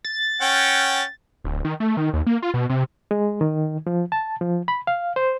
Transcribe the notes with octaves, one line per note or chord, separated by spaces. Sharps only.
A6
C#4 F#5 G5
D1
D#3
A3
D#3
D#2
A#3
F4
B2
C3
G#3
D#3
F3
A5
F3
B5
F5
C5